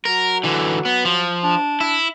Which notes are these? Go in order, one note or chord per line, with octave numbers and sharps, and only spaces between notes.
F#3 A#4
D3 E3
B3
F3
D4
E4